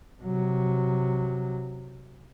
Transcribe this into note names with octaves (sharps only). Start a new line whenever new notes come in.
C3 F#3